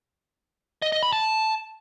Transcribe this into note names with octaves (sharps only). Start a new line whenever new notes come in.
D#5
D#5
B5
A5